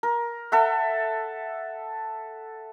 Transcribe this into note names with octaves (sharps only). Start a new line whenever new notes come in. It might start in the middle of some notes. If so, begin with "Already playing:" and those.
A#4
A4 E5 F#5